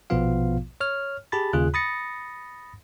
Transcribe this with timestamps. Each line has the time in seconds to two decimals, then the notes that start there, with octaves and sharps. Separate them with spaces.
0.10 A#1 B2 F3 B3 F4 F5
0.80 C#5 F6
1.32 G4 G#4 A5 B5 A6
1.53 D#2 C#3 F4 G#4 F#6
1.74 B5 D#6 A6 A#6 C#7